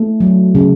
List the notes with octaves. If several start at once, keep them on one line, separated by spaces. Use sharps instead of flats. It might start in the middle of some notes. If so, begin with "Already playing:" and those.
Already playing: A3
F#3
C#3